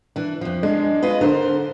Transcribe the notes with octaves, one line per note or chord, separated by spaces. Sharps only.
E3 D4
F2 F3
G#3 D4
F4 B4 D#5
D3 A#4 C5